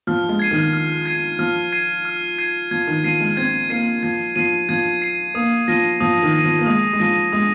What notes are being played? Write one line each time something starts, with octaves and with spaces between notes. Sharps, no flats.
F3 F6
G#3
G#6 C7 D#7
D#3
F6
G#6 C7 D#7
F3 F6
G#6 C7 D#7
F6
G#6 C7 D#7
F3 G#6
D#3
F3 C7 D#7
G#3
C4 G#6
A#3 C7 D#7
F3 G#6
F3 C7 D#7
F3 G#6
C7 D#7
A#3 D#6
F3 A#6 D#7
F3 D#6
D#3
A#6
D#7
F3
A#3
G#3 D#6
G#3
F3 A#6 D#7
G#3 D#6